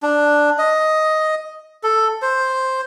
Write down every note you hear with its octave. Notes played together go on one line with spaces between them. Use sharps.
D4
D#5
A4
C5